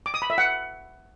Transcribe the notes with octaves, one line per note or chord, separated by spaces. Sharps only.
D6
D#6
B5
E5
F#5